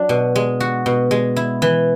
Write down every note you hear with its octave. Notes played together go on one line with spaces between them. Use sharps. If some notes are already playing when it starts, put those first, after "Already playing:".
Already playing: F#3 D4
B2
G#3
F#4
B2
G#3
E4
E3